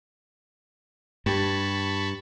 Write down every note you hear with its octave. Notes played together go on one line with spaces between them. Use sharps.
G2 G4 A5 B5 C#6